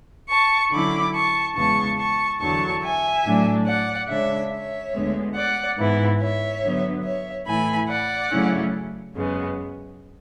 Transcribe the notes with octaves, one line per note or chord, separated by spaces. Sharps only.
A5 C#6
D3 F#3 C#4 E4 B5 D6
A5 C#6
E2 C#3 G#3 B3 A5 C#6
A5 C#6
E2 D3 F#3 A5 C#6
E5 G#5
A2 F#3 A3 D4
D5 F#5
C#3 G#3 D4 C#5 E5
C#5 E5
D2 D3 G#3 B3
D5 F#5
G#2 E3 B3 E4
C#5 E5
D3 F#3 B3
C#5 E5
A2 E3 A3 E4 G#5 B5
D5 F#5
C#3 F#3 A3 C#4 E4
F#2 C#3 G#3 B3